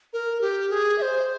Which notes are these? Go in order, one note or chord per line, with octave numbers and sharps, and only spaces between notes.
A#4
G4
G#4
E5
C5